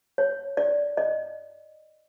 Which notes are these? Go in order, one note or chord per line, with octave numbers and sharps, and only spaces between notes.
C#5
D5
D#5